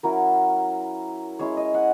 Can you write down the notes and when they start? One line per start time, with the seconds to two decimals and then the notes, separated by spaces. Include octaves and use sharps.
0.03 F#3 C#4 E4 A#4
1.39 G#3 C#4 E4 C#5
1.57 D#5
1.74 F#5